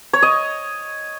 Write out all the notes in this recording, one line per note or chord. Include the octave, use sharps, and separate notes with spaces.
C#5
D#5